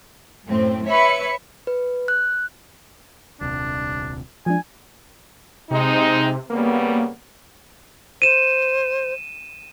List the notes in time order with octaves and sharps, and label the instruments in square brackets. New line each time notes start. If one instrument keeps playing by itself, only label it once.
[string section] F#2 A2 C4
[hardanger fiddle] B4 B5 [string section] C#5 E5 C#7
[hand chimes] B4
F#6
[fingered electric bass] D#1 C2 C3 [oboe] D4
[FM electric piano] F3 G#3 D4 [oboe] G#5
[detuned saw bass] C3 [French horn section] G#3 C4 D#4
[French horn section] C#3 G3 B3 [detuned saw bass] A#3
[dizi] C5 [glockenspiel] D#7 E7